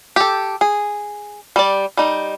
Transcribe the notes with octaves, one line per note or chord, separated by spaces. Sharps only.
G4 A4
G#4
G3 D5
G3 D#4